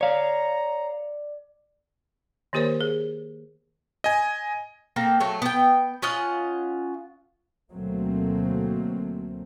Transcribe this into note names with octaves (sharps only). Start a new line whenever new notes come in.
C#5 D5 F5 A#5
D#3 A#3 G4 A#4 C5 C#5
G#4
D#5 G#5
A#3 C4 A4
F#3 A3
B3 G5
C#4 F4 D#5 F#5
D2 B2 F#3 A3 A#3 C4